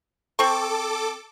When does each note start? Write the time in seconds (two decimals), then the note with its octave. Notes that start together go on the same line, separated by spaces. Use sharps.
0.39 C4 A4 C#6 D6